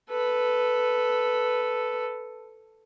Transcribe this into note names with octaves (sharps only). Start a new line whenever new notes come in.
A4 B4